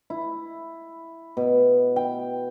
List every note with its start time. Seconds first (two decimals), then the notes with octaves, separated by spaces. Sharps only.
0.10 E4
1.37 B2
1.96 G5